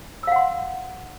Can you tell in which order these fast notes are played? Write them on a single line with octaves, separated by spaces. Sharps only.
E6 F5 F#5 C6